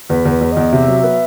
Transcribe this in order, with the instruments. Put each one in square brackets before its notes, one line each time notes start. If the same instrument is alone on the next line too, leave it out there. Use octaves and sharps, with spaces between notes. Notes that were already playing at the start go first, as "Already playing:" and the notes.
[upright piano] E2 [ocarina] B4
[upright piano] E2
[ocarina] B4
[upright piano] E2
[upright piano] E2 [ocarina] D#5
[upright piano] C3 [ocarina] E5
[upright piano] F#3
B3